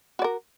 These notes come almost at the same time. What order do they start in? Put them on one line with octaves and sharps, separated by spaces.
F#4 D5 A#4